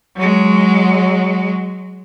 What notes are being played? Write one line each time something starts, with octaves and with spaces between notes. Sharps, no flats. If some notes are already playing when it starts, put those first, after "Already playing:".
F#3 G#3